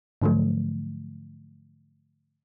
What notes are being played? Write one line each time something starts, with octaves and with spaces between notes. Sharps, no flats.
G#2 D3 F3 F#3 A3